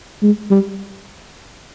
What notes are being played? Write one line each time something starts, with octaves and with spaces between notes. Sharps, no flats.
G#3
G3